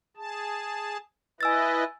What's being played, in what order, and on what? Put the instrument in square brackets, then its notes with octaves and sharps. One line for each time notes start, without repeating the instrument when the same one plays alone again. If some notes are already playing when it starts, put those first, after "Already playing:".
[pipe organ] G#4 A5
[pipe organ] E4 B4 D#5 [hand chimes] G#5 E6 A6